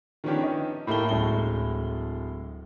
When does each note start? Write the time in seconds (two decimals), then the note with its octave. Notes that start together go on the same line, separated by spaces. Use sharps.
0.24 D#3 F3 B3 C#4 D4 G4
0.43 D#5
0.87 A2 A#3 E4 G4 A5 G7
1.09 D1 A2 G#3 A5 G7